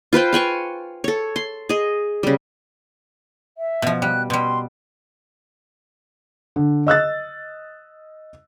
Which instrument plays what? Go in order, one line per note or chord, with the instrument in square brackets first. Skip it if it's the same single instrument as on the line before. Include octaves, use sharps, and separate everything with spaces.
[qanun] F4 B4 C5 G5
F5 G5 G#5 C#6
A4 C#5
C6
G#4 D#5
C#3 G3
[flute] E5
[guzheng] B2 F3
[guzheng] G3 [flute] F#6
[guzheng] B2 G3 [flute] C6
[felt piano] D3
D#5 E6 F#6 A6